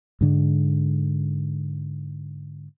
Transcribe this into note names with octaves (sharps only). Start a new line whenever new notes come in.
G#2 D3 G#3